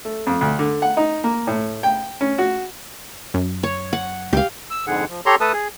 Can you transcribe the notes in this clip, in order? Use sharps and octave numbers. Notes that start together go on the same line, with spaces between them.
A3
F2
D2
D3
F#5
D#4
A#3
A2
G5
C#4
F#4
F#2
C#5
F#5
C#2 G4 F5
E6
F2 G#2 D3 G#4 F#5
F3
G4 A4 C#5 A#5 C6
A3 A4 B4 A5 D#6
G#4